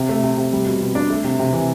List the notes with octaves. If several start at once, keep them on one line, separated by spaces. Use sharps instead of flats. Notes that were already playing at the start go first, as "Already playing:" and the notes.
Already playing: C3
A3
C3
C3
G3
B2
B2
D4
A3
C3
C3
E3